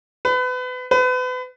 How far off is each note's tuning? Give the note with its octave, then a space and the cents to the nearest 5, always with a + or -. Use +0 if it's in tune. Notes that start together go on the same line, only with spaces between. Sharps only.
B4 +30
B4 +35